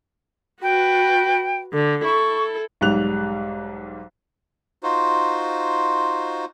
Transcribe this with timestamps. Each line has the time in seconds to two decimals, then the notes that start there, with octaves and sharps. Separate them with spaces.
0.62 F#4 B4 G5
1.73 D3
2.04 E4 A4 C#6
2.81 B1 G#2 G3 F#6 F7
4.83 D#4 F4 F#4 C5